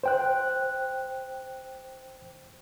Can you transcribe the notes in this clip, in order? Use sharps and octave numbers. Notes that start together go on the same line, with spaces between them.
C5 G5 F#6